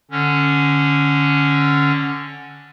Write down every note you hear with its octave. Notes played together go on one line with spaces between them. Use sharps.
D3 C#4